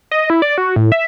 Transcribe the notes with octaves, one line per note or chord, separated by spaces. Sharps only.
D#5
E4
D5
F#4
A2
E5